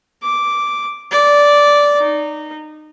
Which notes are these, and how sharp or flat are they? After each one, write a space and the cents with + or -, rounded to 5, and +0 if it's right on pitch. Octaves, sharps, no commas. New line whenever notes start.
D6 -5
D5 -10
D#4 -20